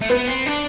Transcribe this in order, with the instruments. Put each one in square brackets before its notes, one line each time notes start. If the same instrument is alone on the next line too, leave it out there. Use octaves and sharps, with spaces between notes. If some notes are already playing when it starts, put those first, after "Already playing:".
[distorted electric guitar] A3
[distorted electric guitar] B3 [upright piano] B4
[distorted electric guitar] C4
D4